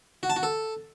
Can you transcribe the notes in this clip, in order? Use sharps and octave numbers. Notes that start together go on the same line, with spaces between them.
F#4
A5
F#4
A4